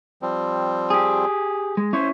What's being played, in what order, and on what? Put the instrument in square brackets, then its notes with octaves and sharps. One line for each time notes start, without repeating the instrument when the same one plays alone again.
[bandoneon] F3 G3 C4
[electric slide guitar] G4 G#4
G#3
[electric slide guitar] C#4 E4 C#5 [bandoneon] C5